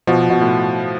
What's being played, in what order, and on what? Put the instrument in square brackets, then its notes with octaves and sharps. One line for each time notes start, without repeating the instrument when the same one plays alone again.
[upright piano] B2 [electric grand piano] F3
[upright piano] B2
[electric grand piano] A2